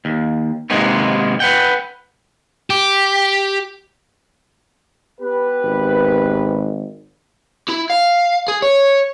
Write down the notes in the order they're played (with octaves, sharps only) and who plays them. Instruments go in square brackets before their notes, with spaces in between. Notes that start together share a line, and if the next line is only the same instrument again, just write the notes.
[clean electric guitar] D#2
G#2 C3 D#3 G#3 A#3 B3
B4 F#5 G5
[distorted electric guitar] G4
[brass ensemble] B3 G4 B4
[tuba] G#1
[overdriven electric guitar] E4
F5
G#4
C#5